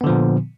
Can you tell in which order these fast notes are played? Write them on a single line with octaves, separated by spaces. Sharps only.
B3 D3 F3 A#2